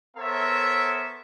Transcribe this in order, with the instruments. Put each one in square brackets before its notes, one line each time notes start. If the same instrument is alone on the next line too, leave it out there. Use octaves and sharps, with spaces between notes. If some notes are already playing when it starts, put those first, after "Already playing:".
[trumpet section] B3 A4 A#4 C5 C#5 E5